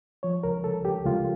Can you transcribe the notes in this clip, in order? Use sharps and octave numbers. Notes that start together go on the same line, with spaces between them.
F3 C#5
C#2 A#4
C#2 A4
C#2 G4
C#2 F4